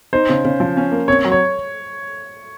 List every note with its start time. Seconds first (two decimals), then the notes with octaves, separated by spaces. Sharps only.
0.13 D#4 C5
0.29 C#3
0.45 C#3
0.60 F3
0.77 C#4
0.92 A#3
1.08 C4 C#5
1.24 F#3
1.32 C#5